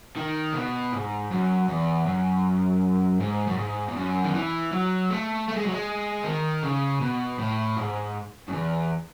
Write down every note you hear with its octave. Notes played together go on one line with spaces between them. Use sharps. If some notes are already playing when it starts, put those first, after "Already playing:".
D#3
B2
G#2
F#2
E2
F#2
G#2
F#2
G#2
E2
F#2
D#3
E3
F#3
A3
A3
G#3
F#3
G#3
D#3
C#3
B2
A2
G#2
F#2
E2